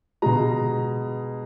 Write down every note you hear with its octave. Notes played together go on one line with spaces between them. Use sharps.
B2 G#3 A#5